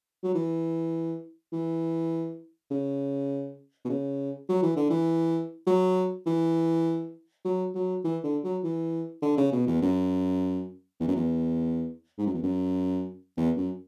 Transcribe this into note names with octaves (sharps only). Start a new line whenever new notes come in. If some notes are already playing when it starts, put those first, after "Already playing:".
F#3
E3
E3
C#3
B2
C#3
F#3
E3
D3
E3
F#3
E3
F#3
F#3
E3
D3
F#3
E3
D3
C#3
B2
E2
F#2
E2
F#2
E2
G#2
F#2
E2
F#2
E2
F#2